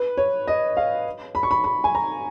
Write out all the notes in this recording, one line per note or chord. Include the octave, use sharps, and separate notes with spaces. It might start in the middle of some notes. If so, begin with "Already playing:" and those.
Already playing: B4
C#5
D#5
F5
B5
C#6
B5
B5
G#5
A#5